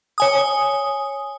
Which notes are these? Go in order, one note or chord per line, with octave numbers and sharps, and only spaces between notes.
C#5 G#5 D#6